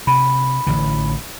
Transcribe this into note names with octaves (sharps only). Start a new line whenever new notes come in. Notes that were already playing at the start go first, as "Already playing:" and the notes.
C3 B5
A1 D3 E3